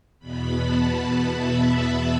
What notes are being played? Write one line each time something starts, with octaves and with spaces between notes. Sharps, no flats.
E2 B2 B3 B5
A5
E5